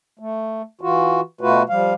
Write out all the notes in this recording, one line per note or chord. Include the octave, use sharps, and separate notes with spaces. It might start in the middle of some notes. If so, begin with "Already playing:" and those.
A3
E3 F4 F#4
B2 A3 F4 F#4 B4
F3 G3 F5